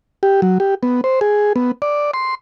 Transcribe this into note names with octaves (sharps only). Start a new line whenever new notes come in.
G4
F#3
G4
B3
C5
G#4
B3
D5
C6